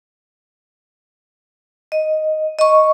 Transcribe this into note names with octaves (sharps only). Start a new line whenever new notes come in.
D#5
D#5 C#6